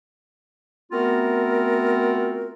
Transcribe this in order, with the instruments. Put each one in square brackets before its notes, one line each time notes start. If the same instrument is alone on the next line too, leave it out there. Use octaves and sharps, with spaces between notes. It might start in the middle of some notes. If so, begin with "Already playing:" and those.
[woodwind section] A3 B3 C4 F4 F#4 A#4